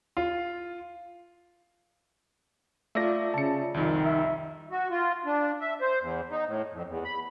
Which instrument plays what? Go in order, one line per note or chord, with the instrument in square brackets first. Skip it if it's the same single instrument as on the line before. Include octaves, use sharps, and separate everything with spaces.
[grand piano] F4
[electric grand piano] A3 A#6 [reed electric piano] F4 D5 E5
[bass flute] C#3 [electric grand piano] A5 C#7
[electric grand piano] C2 F2 [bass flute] D#3
[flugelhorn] E5
[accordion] F#4
F4
D4
E5
C5
E2
D#4
A2
F2
E2
B5